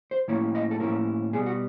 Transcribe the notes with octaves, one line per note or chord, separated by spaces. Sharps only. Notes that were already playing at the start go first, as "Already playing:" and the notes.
C5
A2 F3 A#3 C#4 E4 C#5
D#5
A4
A2 F3 A#3 C#4 E4 A#4
B2 G3 B3 G#4
F#4